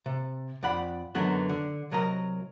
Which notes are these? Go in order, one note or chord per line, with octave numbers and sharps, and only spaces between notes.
C3
F2 D5 F#5 B5
F#2 D3 D#3 F#3 B3 F#4
D3
C2 F#3 A#4 D#5 A#5